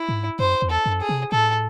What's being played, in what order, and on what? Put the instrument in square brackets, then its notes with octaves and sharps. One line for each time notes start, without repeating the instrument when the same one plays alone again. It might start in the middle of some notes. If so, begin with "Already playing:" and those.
Already playing: [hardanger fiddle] E4
[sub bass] G#2
[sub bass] F#2 [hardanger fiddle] C5
[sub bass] E2
[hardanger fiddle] A4
[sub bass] F#2
[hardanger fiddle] G#4
[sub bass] C3
[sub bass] A2 [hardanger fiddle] A4